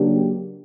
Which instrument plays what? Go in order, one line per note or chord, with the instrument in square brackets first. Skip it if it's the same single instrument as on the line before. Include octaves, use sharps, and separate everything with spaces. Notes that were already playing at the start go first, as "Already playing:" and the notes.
Already playing: [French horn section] C#3 F#3 A#3 D4 G4